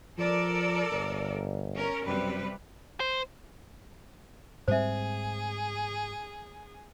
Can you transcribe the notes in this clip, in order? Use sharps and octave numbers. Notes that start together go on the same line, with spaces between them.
F3 A4 A#4 D5
G1
C#4 A#4
F#2 C3 G3 B4
C5
G#2 G3 C4 G#4 C5 E5